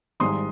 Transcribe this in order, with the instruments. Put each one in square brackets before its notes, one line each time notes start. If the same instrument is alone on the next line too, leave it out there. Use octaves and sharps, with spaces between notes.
[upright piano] G#1 G#2 G3 C6 D#6